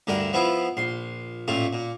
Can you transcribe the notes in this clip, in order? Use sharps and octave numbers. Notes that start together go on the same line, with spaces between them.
D2 G2 D3 A#4
F3 B3 E4 F4
A#1 C6
A1 A#2 A3 F4
A#2